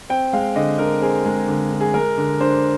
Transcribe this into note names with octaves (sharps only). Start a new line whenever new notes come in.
C4 G5
G#3 F5
D3 D#5
D3 A#4
C4 G#4
G#3
D3
D3
G#4
G#3 A#4
D3
D4 C5